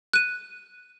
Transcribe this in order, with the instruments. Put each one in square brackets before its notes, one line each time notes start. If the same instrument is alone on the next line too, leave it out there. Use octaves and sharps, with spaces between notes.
[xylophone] F#6 D#7